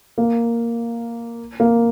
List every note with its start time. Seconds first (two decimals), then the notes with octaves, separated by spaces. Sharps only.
0.18 A#3
1.60 A#3